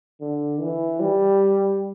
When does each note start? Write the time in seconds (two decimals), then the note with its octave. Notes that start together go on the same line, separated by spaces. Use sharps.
0.21 D3
0.61 E3
1.00 G3